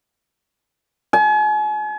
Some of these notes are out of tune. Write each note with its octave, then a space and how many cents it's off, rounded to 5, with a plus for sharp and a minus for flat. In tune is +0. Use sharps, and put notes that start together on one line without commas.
G#5 +40